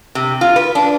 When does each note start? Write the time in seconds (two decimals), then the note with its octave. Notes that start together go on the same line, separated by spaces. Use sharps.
0.15 C3
0.41 F4
0.56 B4
0.75 D4